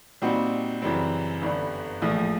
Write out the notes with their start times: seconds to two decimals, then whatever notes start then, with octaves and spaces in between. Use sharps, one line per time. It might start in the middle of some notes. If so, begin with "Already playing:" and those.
0.22 A#2 G3 C4 D#4 F#4
0.82 F#2 C#3 E3 G3 C4
1.42 G1 G2 D3 G3
2.02 A#1 A2 F3